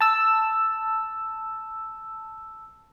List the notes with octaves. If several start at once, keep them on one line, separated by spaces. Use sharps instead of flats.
A5 E6